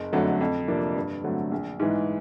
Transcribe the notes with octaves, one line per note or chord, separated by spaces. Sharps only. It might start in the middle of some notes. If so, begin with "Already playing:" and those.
Already playing: F#1
F2 D3 F#3 A3
F2
C3 F3 A#3 D4
G2
D3 F#3 A3 C4
A#1
G#2 E3 G#3